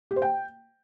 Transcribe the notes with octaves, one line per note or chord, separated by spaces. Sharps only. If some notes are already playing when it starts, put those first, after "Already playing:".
G4
C5
G5